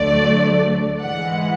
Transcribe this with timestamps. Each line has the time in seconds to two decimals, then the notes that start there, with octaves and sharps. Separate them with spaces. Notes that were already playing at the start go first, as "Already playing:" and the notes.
Already playing: D2 D3 F#3 A3 D5
1.00 G#2 E3 G#3 F#5